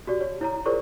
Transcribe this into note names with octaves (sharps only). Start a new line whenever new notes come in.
F#4 G4 D5
C#5
E4 C#5 A#5
F4 G#4 A#4 C5 D5 C#6